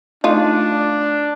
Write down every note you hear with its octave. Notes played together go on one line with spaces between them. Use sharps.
A3 D4 D#4 F4